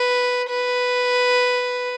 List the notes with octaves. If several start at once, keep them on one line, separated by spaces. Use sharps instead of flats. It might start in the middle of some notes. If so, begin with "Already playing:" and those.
Already playing: B4
B4